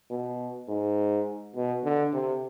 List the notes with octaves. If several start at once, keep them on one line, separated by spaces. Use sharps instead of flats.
B2
G#2
B2
D3
C3